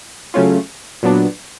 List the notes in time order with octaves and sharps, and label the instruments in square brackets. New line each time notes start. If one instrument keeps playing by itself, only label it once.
[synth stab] C#3 F#3 A3 C#4 F4
A#2 F#3 B3 D4